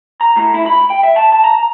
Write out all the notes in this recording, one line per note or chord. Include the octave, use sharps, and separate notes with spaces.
A#5
A2
E4
B5
G5
E5
A5
A5
A#5